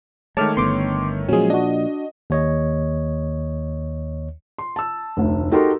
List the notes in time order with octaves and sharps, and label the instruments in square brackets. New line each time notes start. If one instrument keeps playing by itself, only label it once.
[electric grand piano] D#3 A3 C#5 [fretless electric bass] G#3 [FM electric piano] A5 D6 F6
[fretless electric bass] G1 D3 B3 [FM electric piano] C6 D6
[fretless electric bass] A#2 F3 [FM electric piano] F#3 G#3 [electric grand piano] C#4 G#4
[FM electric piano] D4 F#4 [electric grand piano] D#5
[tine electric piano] D#2 C#5 D#5
[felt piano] C6
A5 E6
F1 D2
D#4 F#4 G4 A4 A#4 C6